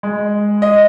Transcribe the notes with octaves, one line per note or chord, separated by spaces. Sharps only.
G#3
D#5